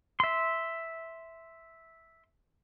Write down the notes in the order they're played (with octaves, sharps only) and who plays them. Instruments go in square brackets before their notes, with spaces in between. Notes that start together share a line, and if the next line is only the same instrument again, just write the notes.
[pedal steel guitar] E5 C6